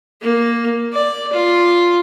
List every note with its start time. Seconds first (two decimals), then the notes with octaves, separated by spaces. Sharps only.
0.22 A#3
0.93 D5
1.33 F4